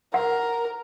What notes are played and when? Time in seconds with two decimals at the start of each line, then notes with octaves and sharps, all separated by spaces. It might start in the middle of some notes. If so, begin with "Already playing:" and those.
0.14 A#4 F#5